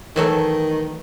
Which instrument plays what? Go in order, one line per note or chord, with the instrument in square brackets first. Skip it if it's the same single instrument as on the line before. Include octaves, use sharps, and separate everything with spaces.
[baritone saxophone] D#3 [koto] E3 F#3 A3